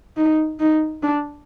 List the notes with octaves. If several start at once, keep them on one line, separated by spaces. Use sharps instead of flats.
D#4
D#4
D4